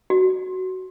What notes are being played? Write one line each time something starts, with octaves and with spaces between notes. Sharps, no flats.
F#4